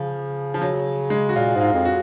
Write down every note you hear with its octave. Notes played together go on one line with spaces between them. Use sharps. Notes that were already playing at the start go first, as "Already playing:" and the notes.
Already playing: C#3 F3
F3
F#3
G#3
F#4
A#2 F4
G#2
F4
F2
F#4